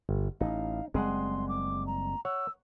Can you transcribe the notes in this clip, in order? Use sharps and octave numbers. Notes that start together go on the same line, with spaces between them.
G1
A1 D#4 F5
F#1 G3 G#3 C4 G#4 F#5 C6
D6
A#5
C#5 F#5 E6